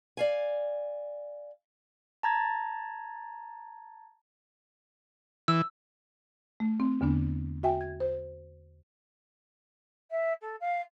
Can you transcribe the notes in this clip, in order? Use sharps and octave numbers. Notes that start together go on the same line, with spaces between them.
D5 F5 G#5
A5 A#5 G#6 A6
E3 E6
A3
C4
E2 D3 B3 D4
F#4 E5 G5 G#5
G#6
C5
E5
A4
F5